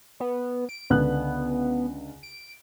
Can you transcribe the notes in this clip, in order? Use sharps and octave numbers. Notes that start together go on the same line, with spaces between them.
B3
D7
C#2 D3 B3 F#6
D7